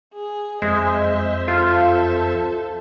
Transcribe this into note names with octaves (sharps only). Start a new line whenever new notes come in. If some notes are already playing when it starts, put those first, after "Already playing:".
G#4
F2 G#3 C5 D#5 E5
F4 A4